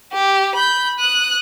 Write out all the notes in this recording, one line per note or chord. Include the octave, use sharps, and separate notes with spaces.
G4
B5 G6
D#6 F#6